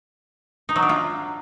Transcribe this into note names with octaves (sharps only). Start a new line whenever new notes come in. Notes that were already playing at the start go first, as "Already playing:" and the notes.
D#4
F#3
D4
F4